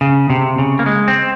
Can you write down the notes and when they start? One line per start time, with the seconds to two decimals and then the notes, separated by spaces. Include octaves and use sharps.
0.01 C#3
0.30 C3
0.58 C#3
0.79 A#3
0.86 G#3
1.08 C4